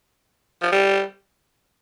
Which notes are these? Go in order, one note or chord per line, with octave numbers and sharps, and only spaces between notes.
F3
G3